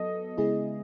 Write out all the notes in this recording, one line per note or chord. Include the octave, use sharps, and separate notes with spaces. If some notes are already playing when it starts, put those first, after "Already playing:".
Already playing: F#3 B3 A4 D#5
C#3 G#3 B3 E4 G#4